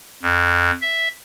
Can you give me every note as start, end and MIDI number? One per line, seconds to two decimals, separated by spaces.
0.23 0.71 41
0.81 1.08 76